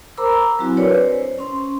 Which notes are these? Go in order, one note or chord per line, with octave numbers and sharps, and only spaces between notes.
A#4 C5 A#5 B5 D6 E6
F#3 C4 E4 F#4 G#5
D4 A#4 B4 C#5 D5
C5
C#4 C6